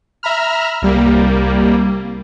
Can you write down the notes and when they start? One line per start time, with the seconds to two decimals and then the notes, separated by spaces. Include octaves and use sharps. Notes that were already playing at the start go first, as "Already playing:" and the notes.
0.23 E5 A#5 B5 F6
0.82 C2 G3 A#3